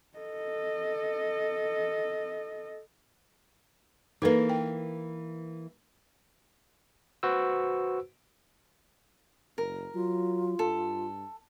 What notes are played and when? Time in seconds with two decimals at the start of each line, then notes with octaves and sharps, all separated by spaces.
0.18 A4 D#5
4.22 E3 A#3 D#4 A4 B4
4.49 G5
7.23 F#4 B4 C5 E6
9.58 F#1 A#4
9.95 F#3 F4
10.59 G2 A4